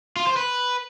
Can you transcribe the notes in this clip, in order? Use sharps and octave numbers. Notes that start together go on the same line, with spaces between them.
F4
C5
B4